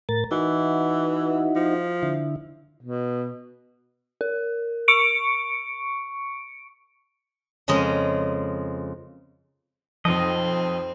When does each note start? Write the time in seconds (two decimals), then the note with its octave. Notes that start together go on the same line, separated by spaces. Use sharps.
0.09 A2 A#4 A6
0.31 E3 D#4 E4 F#4
1.56 F3
2.03 D3 E4
2.81 B2
4.21 A#4
4.88 C#6 C#7 D7
7.68 F2 C#3 G#3 A#4 D#5
10.05 B1 F2 F3 C4 D#5